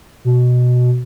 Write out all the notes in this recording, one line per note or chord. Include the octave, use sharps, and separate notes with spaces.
B2